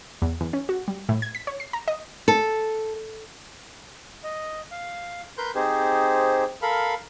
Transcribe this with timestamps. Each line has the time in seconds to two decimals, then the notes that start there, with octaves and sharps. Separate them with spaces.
0.22 E2
0.41 E2
0.53 C#4
0.69 F#4
0.88 G3
1.09 A2
1.22 G#6
1.35 B6
1.47 C#5
1.60 C7
1.73 A#5
1.88 D#5
2.28 A4
4.24 D#5
4.71 F5
5.38 A#4 B4 C6 G6
5.55 C4 D#4 G4 G#4 C5
6.62 A4 A#4 F5 B5